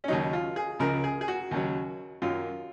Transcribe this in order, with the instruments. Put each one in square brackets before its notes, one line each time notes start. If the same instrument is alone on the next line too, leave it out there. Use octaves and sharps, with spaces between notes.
[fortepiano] C#4
D#2 C#3 F#3 D#4
F4
G#4
C#2 C#3 F3 A#4
G#4
G#4
F#4
D#2 C#3 F#3
F#2 D#3 F#3 F4